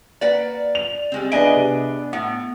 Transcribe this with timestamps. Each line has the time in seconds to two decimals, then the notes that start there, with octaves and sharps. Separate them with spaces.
0.21 A#3 B4 D5 F#5
0.75 F7
1.12 G3 G#3 C4
1.32 B3 D4 G#4 D#5 E5 G#5 D7
1.56 C3
2.13 A2 B3